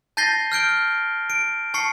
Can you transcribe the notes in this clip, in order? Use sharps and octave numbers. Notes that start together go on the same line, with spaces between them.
A5 G6 A6 A#6 C7 G7
F6 G6 D7 G7
D7
A5 C#6 C7 C#7